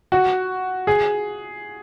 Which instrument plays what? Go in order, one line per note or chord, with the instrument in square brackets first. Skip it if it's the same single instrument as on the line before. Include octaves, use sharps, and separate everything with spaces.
[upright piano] F#4
G#4